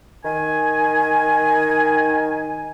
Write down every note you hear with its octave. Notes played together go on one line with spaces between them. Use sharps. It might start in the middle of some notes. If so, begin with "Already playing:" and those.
D#3 G#5